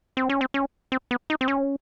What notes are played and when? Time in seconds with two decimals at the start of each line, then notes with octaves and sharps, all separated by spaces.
0.17 C4
0.29 C#4
0.41 C4
0.54 C#4
0.92 C4
1.11 B3
1.30 D#4
1.41 C4
1.48 C#4